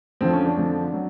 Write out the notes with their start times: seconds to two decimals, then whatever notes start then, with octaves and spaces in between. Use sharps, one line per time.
0.21 F2 D3 F3 C4
0.33 C#4
0.45 D4
0.57 F2 D3 F3
0.93 F#3